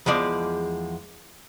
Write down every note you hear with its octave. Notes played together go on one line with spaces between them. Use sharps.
E2 F3 G#3 D5